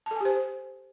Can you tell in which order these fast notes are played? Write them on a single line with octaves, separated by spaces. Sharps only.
A5 A4 G#5 G4 C5